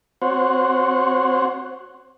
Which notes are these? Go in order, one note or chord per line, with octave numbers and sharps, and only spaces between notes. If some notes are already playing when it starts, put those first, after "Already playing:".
C4 F#4 C5 C#5 F#5